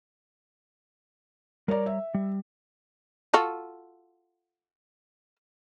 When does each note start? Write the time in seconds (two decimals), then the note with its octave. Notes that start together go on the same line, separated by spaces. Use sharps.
1.68 G3 A#4 C#5 D5 A#5
1.86 E5
2.14 G3
3.34 F4 F#4 A4